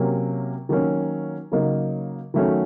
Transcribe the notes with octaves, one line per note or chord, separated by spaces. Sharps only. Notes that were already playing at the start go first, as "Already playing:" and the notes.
Already playing: C3 F#3 A#3 C#4
D#3 F#3 A#3 C#4
C#3 F#3 A#3 D#4
D#3 F#3 A3 C#4 F#4